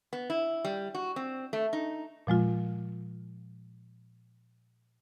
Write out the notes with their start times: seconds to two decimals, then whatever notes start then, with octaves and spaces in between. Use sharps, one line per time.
0.13 B3
0.30 E4
0.65 G3
0.95 F#4
1.16 C4
1.53 A3
1.73 D#4
2.27 A#2 F3 G#3 F4